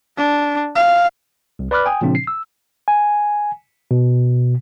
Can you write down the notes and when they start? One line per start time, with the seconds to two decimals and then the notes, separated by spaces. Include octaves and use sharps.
0.17 D4
0.75 F5
1.59 C2
1.71 B4 D5 B5 D6 F6 F#6
1.86 G5 G#5 D#6
2.01 A#2 C#3 F3 C4 D4
2.15 C7
2.27 E6
2.88 G#5
3.91 B2